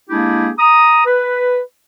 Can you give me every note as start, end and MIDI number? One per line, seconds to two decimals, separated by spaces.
0.10 0.50 56
0.10 0.50 58
0.10 0.50 62
0.10 0.50 64
0.10 0.50 67
0.10 0.50 68
0.59 1.04 82
0.59 1.04 87
1.06 1.60 71